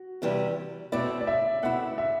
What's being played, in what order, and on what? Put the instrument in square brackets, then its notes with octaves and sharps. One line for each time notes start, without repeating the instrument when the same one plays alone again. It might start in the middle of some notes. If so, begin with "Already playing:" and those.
Already playing: [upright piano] F#4
[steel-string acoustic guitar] E2 C3 E3 G3
[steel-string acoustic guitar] B2 A3 C4 E4 [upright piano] D5
[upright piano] D5
E5
[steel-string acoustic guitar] B2 A3 C4 E4 [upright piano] F#5
[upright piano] E5